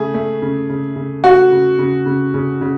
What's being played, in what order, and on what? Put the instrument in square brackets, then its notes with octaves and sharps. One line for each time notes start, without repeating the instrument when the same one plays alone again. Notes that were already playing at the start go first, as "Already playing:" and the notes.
Already playing: [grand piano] C#3 A3 [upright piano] G#4
[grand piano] A3
C#3
C#3
C#3
[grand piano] A3 [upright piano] F#4
[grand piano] C#3
C#3
C#3
C#3
C#3